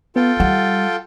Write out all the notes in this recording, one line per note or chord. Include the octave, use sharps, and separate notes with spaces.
B3 F4 A4 G5
G3 F#5